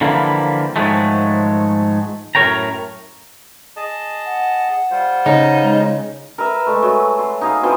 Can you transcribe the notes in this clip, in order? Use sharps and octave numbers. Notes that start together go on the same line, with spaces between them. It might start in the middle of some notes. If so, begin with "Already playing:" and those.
D3 E3 F3 G3 A#3 E4
G#2 D#3 F3 F#3 G#3 A3
F#2 A2 A#4 C#5 G5 A#5
G#4 D#5 A5
F#5
G3 F4 C5
C#3 D#4
G#3
A#4 B4 E5
G#3 A3
F#3
C6
D#4 G#4 F5
E3 F3 C4 F#4